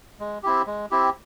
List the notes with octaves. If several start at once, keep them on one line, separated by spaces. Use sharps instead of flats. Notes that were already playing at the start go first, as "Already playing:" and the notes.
G#3
C4 E4 G4
G#3
C4 E4 G4